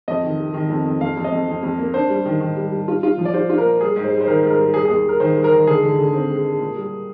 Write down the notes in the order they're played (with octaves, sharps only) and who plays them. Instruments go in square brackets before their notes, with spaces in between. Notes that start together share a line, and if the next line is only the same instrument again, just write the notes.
[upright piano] F2 [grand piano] D#5
[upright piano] D#3
C3
D#3
F2
F2
[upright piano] F2 [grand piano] F5
[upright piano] F2
[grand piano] D#5
[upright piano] F2
F2
F2
A#3
[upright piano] D4 [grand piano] C5
[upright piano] G3
D#3
D#3
G3
G3
F4
F4
F3
[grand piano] D5
[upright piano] F4 [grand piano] C5
[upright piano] F4
[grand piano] A#4
[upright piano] A#2
[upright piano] G3 [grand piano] G#4
[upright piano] G#2
[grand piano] C5
[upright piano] G3
[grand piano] C5
[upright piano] D#3 [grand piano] A#4
[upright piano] G#2
[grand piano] A#4
[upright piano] G3
[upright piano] G3 [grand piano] G#4
[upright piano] D#2 [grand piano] G#4
[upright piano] G3 [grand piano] A#4
[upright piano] D#3 [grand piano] C5
[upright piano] G3
[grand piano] A#4
[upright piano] D#3
[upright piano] D3 [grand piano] G#4
[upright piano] D3
D3
C4
G#3
G#3
A#2
G3